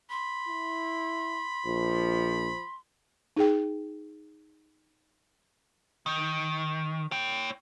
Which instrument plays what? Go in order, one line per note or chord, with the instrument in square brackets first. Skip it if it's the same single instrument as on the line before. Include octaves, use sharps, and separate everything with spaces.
[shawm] B5 [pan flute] C6
[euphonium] E4
[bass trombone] A#1 [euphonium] F3
[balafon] D#4 G#4 G5
[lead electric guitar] D#3
C#5 G5